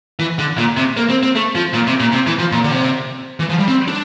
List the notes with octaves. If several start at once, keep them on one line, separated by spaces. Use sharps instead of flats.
E3
D3
A#2
C3
A#3
C4
C4
A3
F3
A#2
C3
A#2
C3
E3
F3
A#2
D3
C3
E3
F3
G3
C4
D4